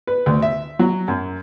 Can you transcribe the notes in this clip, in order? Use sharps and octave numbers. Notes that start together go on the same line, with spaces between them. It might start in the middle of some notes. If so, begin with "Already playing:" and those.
B4
D2
E5
F#3
F#2